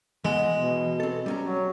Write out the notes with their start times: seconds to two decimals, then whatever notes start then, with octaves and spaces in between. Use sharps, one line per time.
0.25 E3 G#3 B3 F#5
0.53 B2
1.00 C4 A4
1.26 G3 C#4 A#5
1.41 F#3